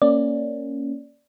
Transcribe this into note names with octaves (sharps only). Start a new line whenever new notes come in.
A#3 C#4 D5